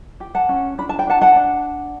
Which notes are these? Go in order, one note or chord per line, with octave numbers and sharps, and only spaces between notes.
G4
F#5 A5
C#4
D4 B5
A5
G5
D4 F#5 A5
F#5 A5
D4